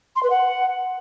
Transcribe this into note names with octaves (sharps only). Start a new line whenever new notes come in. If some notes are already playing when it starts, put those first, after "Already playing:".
C6
B4
F#5